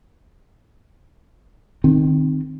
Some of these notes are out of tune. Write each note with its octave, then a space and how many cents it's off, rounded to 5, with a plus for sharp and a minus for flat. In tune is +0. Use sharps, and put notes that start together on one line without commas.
D#3 -20 C4 +0